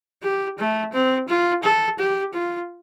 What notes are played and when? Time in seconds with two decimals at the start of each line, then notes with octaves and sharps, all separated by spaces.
0.23 G4
0.59 A3
0.93 C4
1.28 F4
1.64 A4
1.99 G4
2.34 F4